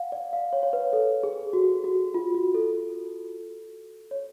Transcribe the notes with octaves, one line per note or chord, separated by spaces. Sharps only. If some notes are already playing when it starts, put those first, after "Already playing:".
Already playing: F5 F#5
D5
F5
C#5
C#5
B4
A4
G#4
F#4
F#4
F4
F#4
A4
C#5